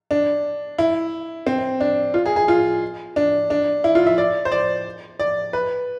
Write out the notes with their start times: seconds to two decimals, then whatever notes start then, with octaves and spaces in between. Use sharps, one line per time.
0.11 D4
0.78 E4
1.47 C4
1.80 D4
2.14 F4
2.26 G#4
2.36 G#4
2.48 F4
3.16 D4
3.50 D4
3.84 E4
3.95 F4
4.07 E5
4.18 D5
4.45 C5
4.52 D5
5.19 D5
5.53 B4